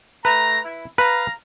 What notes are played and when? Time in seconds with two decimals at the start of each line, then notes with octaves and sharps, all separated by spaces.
0.25 A3 B4 A#5
0.64 E4
0.98 B4 F5 A#5